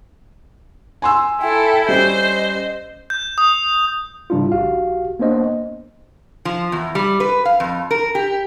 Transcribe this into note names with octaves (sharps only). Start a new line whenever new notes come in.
G#5 C6 E6
E4 A4 G5
G3 C#4 C5 D#5
G6
D#6
G#2 C#3 G3 D4 E4 F4
A#1 F#4 G4 F5
A#3 B3 D4 C5 D#5
F3
E2
G3
B4
F5
F2
A#4
G4